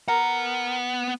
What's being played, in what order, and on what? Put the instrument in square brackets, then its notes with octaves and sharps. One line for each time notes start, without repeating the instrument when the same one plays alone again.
[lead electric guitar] B3 F#5 [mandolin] A#4